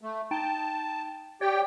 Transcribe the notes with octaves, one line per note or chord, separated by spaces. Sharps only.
A3
D#4 G5 A5
G4 C#5 D5 G5